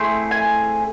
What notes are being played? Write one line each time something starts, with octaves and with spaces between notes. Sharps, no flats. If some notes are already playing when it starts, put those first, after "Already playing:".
Already playing: A3 C4 E4 G#4
G#5